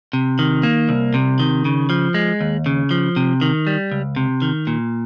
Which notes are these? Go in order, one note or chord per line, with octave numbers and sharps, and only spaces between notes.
C3
D#3
A#3
C2
C3
D#3
C#3
F3
G#3
D#2
C#3
F3
C3
D#3
G3
C#2
C3
D#3
A#2